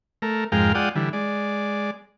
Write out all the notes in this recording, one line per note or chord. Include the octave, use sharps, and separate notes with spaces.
A3 A#4
F2 G#2 G#3 A#4 F5 G5
G#3 F4 D5 F#5 G5 D#6
D3 E3 G3
G#3 D5